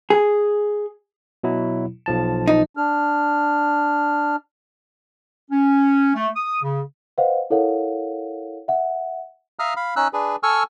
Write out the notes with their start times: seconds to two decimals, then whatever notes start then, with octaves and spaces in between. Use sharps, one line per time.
0.10 G#4
1.43 B2 F#3 E4
2.06 B1 F3 A5
2.48 D#4
2.77 D4 F6
5.51 C#4
6.15 A3
6.36 D#6
6.63 C#3
7.18 B4 C5 D#5 F5 F#5
7.50 E4 A4 A#4 C#5 F5 F#5
8.68 E5 F#5
9.59 E5 F5 A#5 D#6 F6
9.76 F5 B5
9.96 C#4 D#4 E6 F#6
10.13 D4 G#4 B4
10.43 A4 G#5 C#6 E6 F6